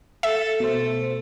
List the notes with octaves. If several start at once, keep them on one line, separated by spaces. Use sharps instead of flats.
A4 E5
B2 A3 C5